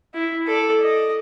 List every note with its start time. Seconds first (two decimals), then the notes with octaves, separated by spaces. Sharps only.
0.14 E4
0.47 A4 D5
0.82 D#5